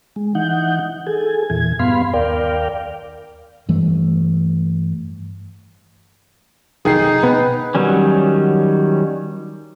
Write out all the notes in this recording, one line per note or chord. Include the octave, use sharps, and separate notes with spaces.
G#3
E3 D#4 F#5 G6
G#4 A4 G#5
E2 A#2 E3 G#6
G2 B3 F5 B5 C6
D#2 A#4 D5 F5 G5
G2 E3 A3
F1 B1 D#3 D#4 G#4 G5 C7
B2 B3 B4
D#3 F#3 G3 C#4